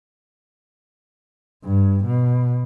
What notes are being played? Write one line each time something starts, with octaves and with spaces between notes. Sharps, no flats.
G2
B2